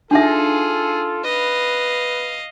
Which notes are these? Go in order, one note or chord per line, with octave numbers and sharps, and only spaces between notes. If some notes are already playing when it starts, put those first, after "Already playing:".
D4 D#4 F4 G#4 A4 E5
B4 D#5 F5